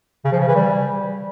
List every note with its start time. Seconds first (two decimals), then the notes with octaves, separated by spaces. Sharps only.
0.25 C#3
0.32 F3
0.40 C#3
0.48 E3
0.55 G3